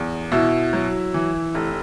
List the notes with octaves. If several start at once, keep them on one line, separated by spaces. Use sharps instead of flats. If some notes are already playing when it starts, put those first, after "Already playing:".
Already playing: E2
B2 E4
F#3
E3
F1